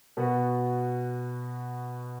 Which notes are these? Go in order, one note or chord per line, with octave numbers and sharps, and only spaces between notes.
B2 B3 F#4